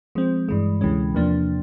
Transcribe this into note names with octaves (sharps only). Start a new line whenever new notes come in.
F3 G#3 C4
G2 E3 G#3
D2 C3 E3 G#3 C#4
E2 C3 F3 A#3 D4